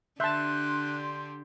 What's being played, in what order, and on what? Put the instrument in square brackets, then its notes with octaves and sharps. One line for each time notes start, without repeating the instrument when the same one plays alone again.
[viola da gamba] D3 D4 G4 [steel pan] E5 A5 [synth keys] C6 G6 [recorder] F#6